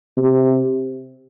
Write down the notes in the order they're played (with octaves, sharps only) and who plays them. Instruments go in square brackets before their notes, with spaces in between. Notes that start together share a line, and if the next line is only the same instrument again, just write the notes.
[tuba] C3